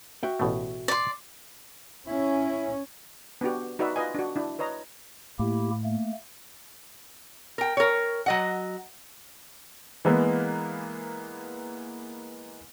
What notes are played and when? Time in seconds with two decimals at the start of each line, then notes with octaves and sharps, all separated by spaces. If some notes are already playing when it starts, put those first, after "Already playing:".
0.23 F#4 E5 G5
0.40 A1 B2 A3
0.88 D5 C6
2.07 C#4 E4
3.41 B3 D4 F#4 G4
3.79 D#4 F#4 B4 D5 E5
3.96 F4 B4 D#5 G#5
4.15 D4 F#4
4.36 D4 E4
4.59 B4 C#5 D#5 A#5
5.39 A2 A#3 E4 G4
5.84 A3 A#3
7.58 A#4 G5
7.77 A#4 C#5
8.26 F#3 D#5 F#5
10.05 E3 G#3 A#3 B3